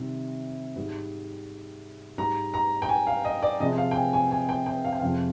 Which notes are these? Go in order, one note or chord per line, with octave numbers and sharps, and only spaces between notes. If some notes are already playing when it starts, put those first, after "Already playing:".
Already playing: C3 D#3 G3
G#2 G3
G#2 G3 A#5
A#5
G5
G#5
F5
D#5
D5
C3 F3 G#3 D#5
F5
G5
G#5
G#5
G#5
G5
G5
F5
G5
F2 C3 F3 G#3 F5